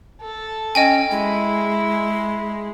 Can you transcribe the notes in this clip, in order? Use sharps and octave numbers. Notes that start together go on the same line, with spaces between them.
A4
C#4 D#5 G5 G#5
G#3 E4